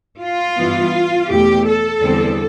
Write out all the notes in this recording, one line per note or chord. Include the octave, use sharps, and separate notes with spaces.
F4
G2 E3 B3
E2 B2 A3 G4
A4
E2 D3 G3 C4